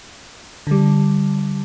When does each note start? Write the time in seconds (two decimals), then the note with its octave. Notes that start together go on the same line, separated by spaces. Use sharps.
0.67 D3 G3